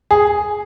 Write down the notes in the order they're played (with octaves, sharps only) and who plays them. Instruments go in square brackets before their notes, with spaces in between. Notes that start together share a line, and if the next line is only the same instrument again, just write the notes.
[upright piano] G#4